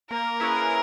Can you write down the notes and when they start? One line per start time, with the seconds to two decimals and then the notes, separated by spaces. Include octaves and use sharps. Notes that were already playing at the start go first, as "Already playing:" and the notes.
0.11 A#3 A#4
0.40 C#4 E4 G#4 B4